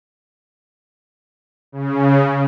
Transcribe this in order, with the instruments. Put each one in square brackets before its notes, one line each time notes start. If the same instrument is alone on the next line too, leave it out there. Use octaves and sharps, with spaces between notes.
[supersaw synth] C#3